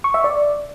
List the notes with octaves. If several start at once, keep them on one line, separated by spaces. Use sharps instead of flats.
C#6
E5
D5